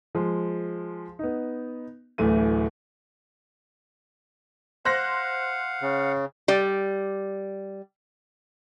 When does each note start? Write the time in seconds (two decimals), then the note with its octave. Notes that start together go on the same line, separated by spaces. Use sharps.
0.15 F3 G#3
1.19 B3 D#4
2.18 D1 D2 E3 A3 D#7
4.85 C5 F5 F#5 F#6 A#6
5.82 C#3
6.48 G3 D5